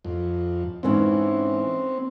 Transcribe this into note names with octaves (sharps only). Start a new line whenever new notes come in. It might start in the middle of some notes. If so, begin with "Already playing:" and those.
F2
G#2 E3 C4 C#4